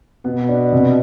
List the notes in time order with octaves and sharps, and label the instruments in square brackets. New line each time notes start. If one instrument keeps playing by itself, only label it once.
[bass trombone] B2 [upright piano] B3
[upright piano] D4
C3